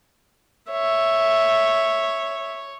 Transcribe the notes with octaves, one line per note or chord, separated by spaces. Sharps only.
C#5 E5